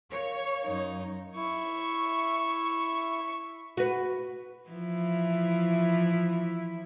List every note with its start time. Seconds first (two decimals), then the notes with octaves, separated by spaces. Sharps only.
0.12 A#4 C#5 F5
0.64 F#2 D#4
1.36 E4 E5 C#6
3.77 F#4 B4
4.69 E3 F3 E4